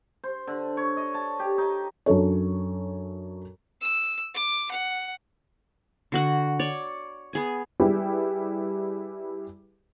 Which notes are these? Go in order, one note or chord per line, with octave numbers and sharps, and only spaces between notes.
C5
D3
C#5
D#5
A5
G4
D#4
F#2 D4 A4 C#5
E6
D6
F#5
D3 F#4 F#5
C#5 D5
B3 G#4 G#5
G3 E4 G#4 B4 G5